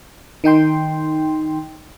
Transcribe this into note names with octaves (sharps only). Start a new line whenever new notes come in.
D#3 D#4 G5 C6